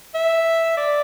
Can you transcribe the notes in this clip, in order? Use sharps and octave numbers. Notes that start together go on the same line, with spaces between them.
E5
D5